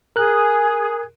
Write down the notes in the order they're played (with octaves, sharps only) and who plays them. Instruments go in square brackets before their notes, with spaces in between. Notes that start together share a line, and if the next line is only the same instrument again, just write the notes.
[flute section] G#4 [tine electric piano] A#4 F#6